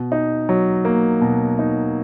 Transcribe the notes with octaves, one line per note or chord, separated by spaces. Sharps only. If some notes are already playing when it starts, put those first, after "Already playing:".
Already playing: B2
D#4
F#3
A#3
B2
D#4